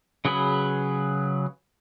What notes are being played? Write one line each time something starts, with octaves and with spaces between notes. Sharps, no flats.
C#3 F#3 G#4 B4 B5